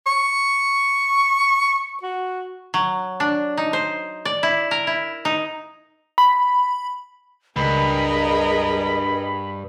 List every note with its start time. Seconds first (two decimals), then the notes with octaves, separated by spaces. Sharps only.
0.07 C#6
2.03 F#4
2.74 F#3
3.20 D4
3.57 D#4
3.73 C5
4.25 D5
4.43 E4
4.71 A#4
4.87 E4
5.25 D#4
6.18 B5
7.56 C#2 G2 G#4 A#4 D#5 B5